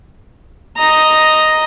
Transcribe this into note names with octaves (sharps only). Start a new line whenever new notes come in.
D#5 A#5